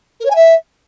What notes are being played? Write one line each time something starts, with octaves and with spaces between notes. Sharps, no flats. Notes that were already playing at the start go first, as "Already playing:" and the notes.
A#4
C#5
G#5
E5